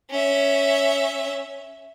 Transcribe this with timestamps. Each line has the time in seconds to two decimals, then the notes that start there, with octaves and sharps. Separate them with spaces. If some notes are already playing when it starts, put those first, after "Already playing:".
0.10 C#4 E5